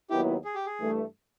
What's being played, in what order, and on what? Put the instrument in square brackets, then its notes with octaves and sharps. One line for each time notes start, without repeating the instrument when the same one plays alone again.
[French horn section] D#2 D#3 F#3 B3 E4 [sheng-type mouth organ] G4
[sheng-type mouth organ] G#4
G4
G#4
[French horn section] G2 E3 A3